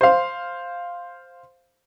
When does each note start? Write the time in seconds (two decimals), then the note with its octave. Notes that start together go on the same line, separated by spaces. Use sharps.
0.01 C5 F5